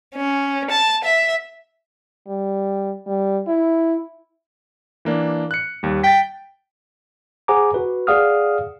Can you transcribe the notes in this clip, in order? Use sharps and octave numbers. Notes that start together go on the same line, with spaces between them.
C#4
A5
E5
G3
G3
E4
E3 A#3 D4
F#6 C#7
D#2 G3
G5 A6 B6
G#4 C5 F#5 G#5 A#5 D6
F#4 B4
G#4 D5 F5 F#5 D#6 F6